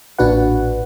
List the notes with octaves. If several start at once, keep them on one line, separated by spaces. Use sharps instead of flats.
A1 A#2 D4 F#4 B4 F#5